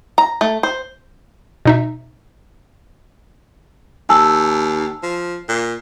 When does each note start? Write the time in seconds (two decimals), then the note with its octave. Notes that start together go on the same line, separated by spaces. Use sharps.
0.18 A#5
0.41 A3
0.63 C5
1.65 B2 D#4 E5
4.09 D#2 G#5 A5 E6
5.03 F3
5.49 A#2